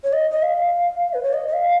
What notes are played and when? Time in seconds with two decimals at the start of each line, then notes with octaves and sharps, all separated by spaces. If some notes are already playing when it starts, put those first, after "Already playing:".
0.04 C#5
0.13 D#5
0.31 D#5
0.43 F5
1.14 B4
1.23 C#5
1.33 D#5
1.48 D#5
1.53 F5